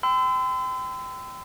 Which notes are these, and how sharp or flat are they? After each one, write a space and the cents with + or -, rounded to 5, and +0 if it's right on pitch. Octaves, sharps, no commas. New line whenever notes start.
G5 +0 C6 -40 E6 +0